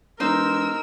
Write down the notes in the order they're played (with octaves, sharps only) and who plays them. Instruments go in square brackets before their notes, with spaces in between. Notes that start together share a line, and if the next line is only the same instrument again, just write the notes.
[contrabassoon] E1 [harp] D#4 C5 [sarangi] A#4 [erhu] E6